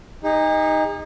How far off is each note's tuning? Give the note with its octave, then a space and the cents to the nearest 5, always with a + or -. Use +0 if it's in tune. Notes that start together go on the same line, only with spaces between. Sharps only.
D#4 +0 G#4 -45